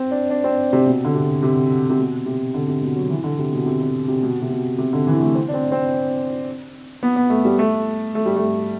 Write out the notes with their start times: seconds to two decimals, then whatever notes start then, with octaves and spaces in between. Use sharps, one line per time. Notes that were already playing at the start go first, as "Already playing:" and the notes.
Already playing: C4
0.11 D4
0.30 D4
0.44 C4
0.73 C3
0.86 B2
1.05 D3
1.14 C3
1.43 C3
1.90 C3
1.99 B2
2.26 C3
2.54 D3
2.68 C3
2.82 B2
2.96 F#3
3.10 E3
3.24 D3
3.39 C3
3.53 B2
3.66 C3
3.81 D3
4.08 C3
4.23 B2
4.42 C3
4.50 B2
4.78 C3
4.93 D3
5.07 E3
5.21 A3
5.35 C4
5.49 D4
5.54 C4
5.72 C4
7.03 B3
7.16 B3
7.30 A3
7.45 G3
7.59 A3
8.15 A3
8.26 G3
8.36 A3